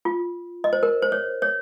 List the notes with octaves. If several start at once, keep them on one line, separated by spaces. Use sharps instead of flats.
F4
D#5
C5
A#4
C5
C#5
C#5